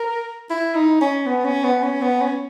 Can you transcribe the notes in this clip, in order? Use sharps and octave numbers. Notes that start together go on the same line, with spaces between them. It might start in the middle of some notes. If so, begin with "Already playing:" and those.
Already playing: A#4
E4
D#4
C#4
B3
C#4
B3
C#4
B3
C#4